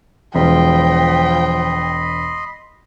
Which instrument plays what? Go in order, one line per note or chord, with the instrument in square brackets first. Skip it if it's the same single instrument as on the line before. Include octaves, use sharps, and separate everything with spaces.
[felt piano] E1 [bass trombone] F3 [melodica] D#5 B5 C6 [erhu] G5